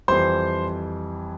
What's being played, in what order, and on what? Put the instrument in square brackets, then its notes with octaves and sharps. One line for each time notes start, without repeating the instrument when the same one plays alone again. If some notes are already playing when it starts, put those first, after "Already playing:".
[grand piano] F2 E3 G3 C5 C6